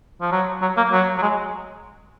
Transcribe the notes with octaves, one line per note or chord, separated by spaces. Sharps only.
F3
F#3
F#3
A#3
F#3
F#3
G#3